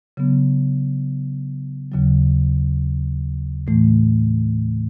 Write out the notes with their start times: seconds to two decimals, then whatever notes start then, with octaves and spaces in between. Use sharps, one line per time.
0.17 C#3 F#3 B3
1.92 D#2 C#3 F#3
3.67 A2 E3 A3